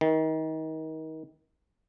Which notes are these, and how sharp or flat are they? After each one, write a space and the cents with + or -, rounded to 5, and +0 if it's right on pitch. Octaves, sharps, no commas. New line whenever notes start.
D#3 +30